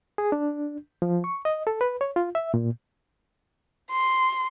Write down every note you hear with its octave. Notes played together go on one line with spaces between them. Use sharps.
G#4
D4
F3
C#6
D#5
A4
B4
C#5
F4
E5
A#2
C6